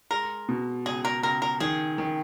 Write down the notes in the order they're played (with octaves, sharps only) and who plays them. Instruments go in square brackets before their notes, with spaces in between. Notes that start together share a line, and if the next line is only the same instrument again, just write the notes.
[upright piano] G#3 [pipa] A#4
[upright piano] B2
[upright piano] C#2 [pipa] G#4
[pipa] A#4
[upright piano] C#2 [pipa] A#4
[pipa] A#4
[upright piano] D#3 [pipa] G#4
[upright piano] D#3